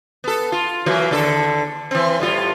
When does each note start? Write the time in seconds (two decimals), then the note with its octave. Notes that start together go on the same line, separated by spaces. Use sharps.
0.24 B3 A4
0.52 F4
0.86 E3 F#3 A#3
1.11 D#2 D3 A4
1.91 E3 C4
2.20 A2 G3 F4